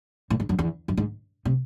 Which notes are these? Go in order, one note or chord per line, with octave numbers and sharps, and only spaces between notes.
A2
G#2
F#2
E2
F#2
G#2
C3